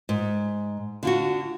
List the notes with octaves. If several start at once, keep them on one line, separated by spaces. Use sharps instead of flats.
G#2
D3 F4 F#4